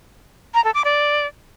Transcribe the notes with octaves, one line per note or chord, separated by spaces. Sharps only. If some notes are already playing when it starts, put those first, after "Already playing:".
A#5
A4
D6
D5